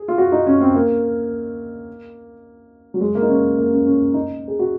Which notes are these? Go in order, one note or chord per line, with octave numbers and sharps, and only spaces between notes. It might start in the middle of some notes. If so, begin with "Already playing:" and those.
Already playing: G#4
F4
F#4
D#4
C#4
C4
A#3
F#3
G#3
A#3
D#4
C#4
A#3
C#4
C#4
D#4
G#4
F#4